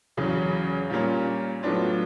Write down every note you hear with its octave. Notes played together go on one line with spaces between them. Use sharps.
E2 C#3 F#3
A#2 G3 A#3 C#4 F4
A2 F#3 B3 D4 F4